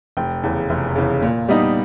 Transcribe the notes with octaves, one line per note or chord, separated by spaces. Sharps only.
F1 G5
E2 C#3
F1
E2 C#3
A#2
G3 B3 D#4